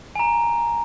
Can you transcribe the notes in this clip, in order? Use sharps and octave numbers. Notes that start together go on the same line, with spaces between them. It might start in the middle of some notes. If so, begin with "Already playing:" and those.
G#5 A#5